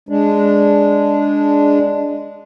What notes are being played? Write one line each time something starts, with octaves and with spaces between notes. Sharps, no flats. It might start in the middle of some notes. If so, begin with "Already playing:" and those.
G#3 D4